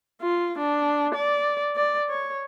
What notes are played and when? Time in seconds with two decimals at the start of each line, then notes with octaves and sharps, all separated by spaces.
0.22 F4
0.58 D4
1.15 D5
1.76 D5
2.09 C#5